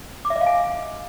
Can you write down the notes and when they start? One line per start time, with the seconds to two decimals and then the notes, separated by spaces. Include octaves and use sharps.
0.25 D6
0.30 E5
0.36 D#5
0.41 F5
0.46 G#5